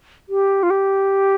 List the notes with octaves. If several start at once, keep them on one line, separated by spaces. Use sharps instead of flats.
G4
F4
G4